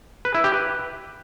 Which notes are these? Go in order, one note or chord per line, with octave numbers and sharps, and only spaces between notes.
B4
E4
G4
B4